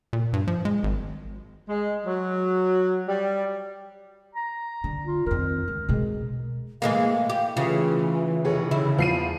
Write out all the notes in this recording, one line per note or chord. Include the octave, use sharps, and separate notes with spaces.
A#2
G2
F3
G#3
G#1
G#3
F#3
G3
A#5
D3
F4
F2 D#3 A#4
C#2
B2 G#3
A2 E3 G#3 A#3 F5
G4
C#3 E3 F4
F1 G#4 C#5
C#3 E4 B5
E2 F3 C7 D#7